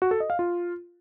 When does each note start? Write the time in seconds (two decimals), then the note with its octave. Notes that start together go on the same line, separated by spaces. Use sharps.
0.02 F#4
0.11 A4
0.20 D#5
0.30 F5
0.39 F4